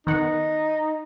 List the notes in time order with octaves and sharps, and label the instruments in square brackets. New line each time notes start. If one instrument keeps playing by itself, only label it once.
[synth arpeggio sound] D#3 B3 F#5 [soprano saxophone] D#4